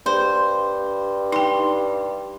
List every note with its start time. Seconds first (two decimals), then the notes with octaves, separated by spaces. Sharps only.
0.06 G2 C5
1.32 D#4 G5 C6